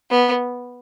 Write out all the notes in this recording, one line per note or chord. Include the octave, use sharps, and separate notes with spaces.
B3